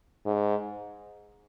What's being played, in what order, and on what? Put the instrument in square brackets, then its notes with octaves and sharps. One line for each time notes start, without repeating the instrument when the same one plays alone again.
[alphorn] G#2